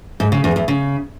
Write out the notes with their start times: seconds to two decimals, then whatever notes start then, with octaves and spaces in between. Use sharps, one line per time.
0.20 G#2
0.32 C#3
0.44 E2
0.56 E2
0.68 C#3